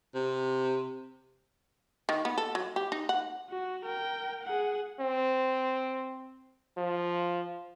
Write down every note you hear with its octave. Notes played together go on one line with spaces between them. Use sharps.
C3
D#3
B3
A4
F#3
G4
D#4
F#5
F#4
A#4 G5
G#4 F#5
C4
F3